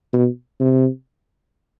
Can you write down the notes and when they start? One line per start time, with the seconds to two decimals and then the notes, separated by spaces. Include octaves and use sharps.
0.13 B2
0.60 C3